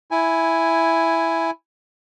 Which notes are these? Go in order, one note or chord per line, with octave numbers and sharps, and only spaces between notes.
E4 G#5